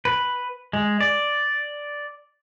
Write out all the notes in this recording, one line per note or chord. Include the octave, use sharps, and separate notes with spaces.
B4
G#3
D5